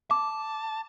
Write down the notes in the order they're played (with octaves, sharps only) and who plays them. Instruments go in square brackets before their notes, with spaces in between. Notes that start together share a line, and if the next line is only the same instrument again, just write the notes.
[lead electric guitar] A5 [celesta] D6